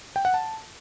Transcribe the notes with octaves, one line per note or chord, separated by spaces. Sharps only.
G5
F#5
A5